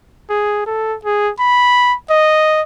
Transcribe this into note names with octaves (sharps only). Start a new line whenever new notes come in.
G#4
A4
G#4
B5
D#5